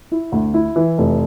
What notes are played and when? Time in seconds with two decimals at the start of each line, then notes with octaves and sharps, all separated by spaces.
0.12 E4
0.32 D2
0.54 E4
0.76 E3
0.98 F1